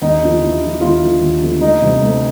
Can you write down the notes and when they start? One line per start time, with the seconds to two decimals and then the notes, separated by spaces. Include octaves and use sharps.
0.02 D#2 D#4
0.21 D3 F3
0.41 D#2 E4
0.62 D3 F3
0.81 D#2 F4
1.01 D3 F3
1.21 D#2
1.42 D3 F3
1.61 D2 D#4
1.81 C3 E3 G3
2.01 D2